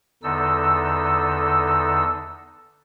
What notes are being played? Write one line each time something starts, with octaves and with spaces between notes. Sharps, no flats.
E2 D3 D#4 A4 E6